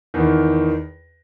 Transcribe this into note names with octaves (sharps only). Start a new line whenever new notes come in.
E2 D#3